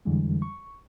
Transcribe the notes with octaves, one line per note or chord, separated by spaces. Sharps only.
F2 D3 E3 G3 G#3
C#6